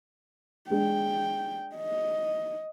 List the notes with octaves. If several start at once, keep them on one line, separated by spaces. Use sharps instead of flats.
G#3 D4 G5
D#5